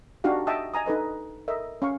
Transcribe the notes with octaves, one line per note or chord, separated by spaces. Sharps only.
D4 D#4 F#4 G4 F5
D#5 E5 G5 A5 C#6 D#6
D#5 G#5 A#5 D#6
D4 D#4 A4 B4 D#5
A4 A#4 D#5 E5
C#4 F5 C#6